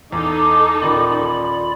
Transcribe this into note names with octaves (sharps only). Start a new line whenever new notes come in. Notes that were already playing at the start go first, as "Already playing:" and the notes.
E2 D#4 A4 D6
D#1 D#3 F4 D5 B5